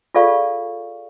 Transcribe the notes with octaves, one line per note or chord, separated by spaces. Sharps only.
F4 G#4 A4 D5 F5 C#6